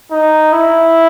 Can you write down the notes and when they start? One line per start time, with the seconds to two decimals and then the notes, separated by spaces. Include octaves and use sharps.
0.12 D#4
0.53 E4